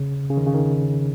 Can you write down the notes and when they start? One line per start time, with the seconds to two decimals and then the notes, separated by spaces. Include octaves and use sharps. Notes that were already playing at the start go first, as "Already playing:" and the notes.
Already playing: C#3
0.30 C#3
0.37 D#3
0.47 C#3
0.54 D#3